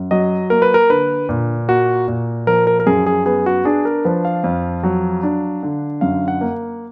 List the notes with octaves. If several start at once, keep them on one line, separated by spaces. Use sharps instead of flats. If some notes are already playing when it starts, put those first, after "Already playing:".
Already playing: F#2
F#3 D#5
A#3 A#4
B4
A#4
D3 B4
A#2
A#3 F#4
A#2
F3 A#4
A#4
A#4
F#2 G#4
G#4
B3 G#4
F#4
D4 G#4
A#4
F3 B4
F5
F2
F#3
D4
D3
F#2 F5
F#5
A#3